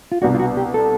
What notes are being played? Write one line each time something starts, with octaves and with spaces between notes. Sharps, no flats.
F4
C2 B2 G3 B3 D4 F#4
F4
F#4
G4
A4